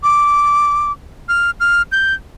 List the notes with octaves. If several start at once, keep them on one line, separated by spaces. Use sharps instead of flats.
D6
F6
F6
G6